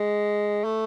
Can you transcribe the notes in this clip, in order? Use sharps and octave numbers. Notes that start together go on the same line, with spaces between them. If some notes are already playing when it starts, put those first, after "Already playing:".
Already playing: G#3
A3